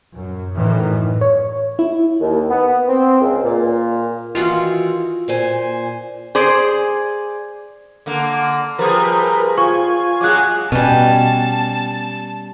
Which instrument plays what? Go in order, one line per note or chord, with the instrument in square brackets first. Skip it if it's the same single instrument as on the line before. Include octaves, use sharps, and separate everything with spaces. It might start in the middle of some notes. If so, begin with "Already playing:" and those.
[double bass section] F#2
F#2 A2 D#3 E3
[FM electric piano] C#5
E4
[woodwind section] D#2
B3
C4
C#2
A#2
[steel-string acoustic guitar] D#3 E3 F#4 [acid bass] F4
[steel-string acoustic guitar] A#2 C5 G#5
[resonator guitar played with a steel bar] G#4 C5 D5
[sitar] D3 A#3
[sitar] F3 G3 G#4 [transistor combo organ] A#4 B4
[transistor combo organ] F4 G#5 [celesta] C#6
[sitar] F#3 G#3 G#4 [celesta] D6 F#6
[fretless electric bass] B2 [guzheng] G3 C#4 [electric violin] A5